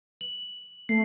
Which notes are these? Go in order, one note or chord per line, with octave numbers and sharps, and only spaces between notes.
F#7
A3 C7